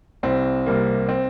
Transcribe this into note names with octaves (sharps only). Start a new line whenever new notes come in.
C2 C4
C3 G3 A#3
C4